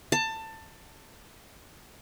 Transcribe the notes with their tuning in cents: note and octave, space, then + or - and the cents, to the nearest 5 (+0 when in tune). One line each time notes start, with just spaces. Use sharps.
A5 +20